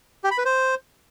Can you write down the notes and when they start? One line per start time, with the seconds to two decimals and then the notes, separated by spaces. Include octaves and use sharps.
0.24 G4
0.31 B5
0.38 B4
0.45 C5